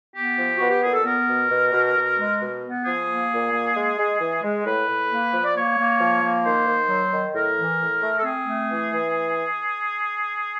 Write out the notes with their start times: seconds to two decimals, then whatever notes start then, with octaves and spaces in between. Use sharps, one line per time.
0.14 B3 G4
0.36 F3
0.57 B3 F#4
0.69 G4
0.81 A#2 G#4
0.93 A4
1.05 B3 A#4
1.27 B2
1.50 B2
1.72 B2
1.95 B2
2.17 G#3
2.39 B2
2.62 B3
2.84 F3 G#4
3.07 A#3
3.30 A#2
3.52 A#3
3.74 G#3
3.97 G#3
4.20 E3
4.42 G#3
4.64 A2 B4
4.87 A2
5.10 A#3
5.32 F3
5.43 D5
5.55 A#3 C#5
5.78 A#3
6.00 F3
6.22 A#3
6.44 D#3 C5
6.67 D#3
6.89 F#3
7.12 D#3
7.34 A2 A#4
7.57 E3
7.80 A2
8.02 A3
8.18 A4
8.24 C4 G#4
8.48 A3
8.70 E3
8.92 E3